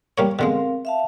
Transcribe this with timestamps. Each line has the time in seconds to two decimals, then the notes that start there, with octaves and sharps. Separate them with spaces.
0.18 G3 A#3 C#5
0.39 B2 D3 G#3 C4 A#4 F5
0.85 E5 F5 A5